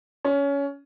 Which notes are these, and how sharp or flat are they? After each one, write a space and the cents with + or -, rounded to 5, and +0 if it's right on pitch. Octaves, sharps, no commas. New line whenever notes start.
C#4 +20